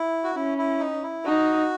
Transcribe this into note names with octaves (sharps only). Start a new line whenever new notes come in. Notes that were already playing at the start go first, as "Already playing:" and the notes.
Already playing: E4
F#4
C#4 E4
E4
D#4
E4
D#4 F#4